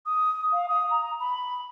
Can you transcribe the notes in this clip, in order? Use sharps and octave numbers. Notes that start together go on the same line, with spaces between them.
D#6
F5
D#6
A#5
B5